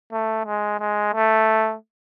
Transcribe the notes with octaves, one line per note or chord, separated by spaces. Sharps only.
A3
G#3
G#3
A3